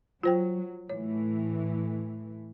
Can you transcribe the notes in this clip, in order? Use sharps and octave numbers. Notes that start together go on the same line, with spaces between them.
F#3 F4 C5 G5
A2 E3 C#5